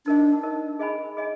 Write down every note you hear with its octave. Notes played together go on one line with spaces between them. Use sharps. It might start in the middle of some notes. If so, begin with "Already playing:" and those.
D4 D#4 A#4 D#5
D#4 A#4 D#5
G#4 D#5 G#5 B5
G#4 D#5 G#5